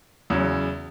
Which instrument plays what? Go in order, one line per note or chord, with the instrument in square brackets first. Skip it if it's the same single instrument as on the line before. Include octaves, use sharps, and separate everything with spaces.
[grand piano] E2 C#3 F#3